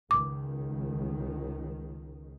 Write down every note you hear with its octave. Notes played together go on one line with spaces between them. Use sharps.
C#2 D#3 D6